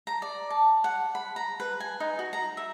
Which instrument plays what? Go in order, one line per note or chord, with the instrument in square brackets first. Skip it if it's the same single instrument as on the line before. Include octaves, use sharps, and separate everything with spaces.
[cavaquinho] A#5
D5
A5
F#5
B5
A#5
B4
G#5
D#4
F#4
A#5
E5